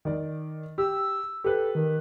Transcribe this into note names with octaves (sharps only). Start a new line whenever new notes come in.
D#3 D5
G4 E6
G4 A4 B4
D#3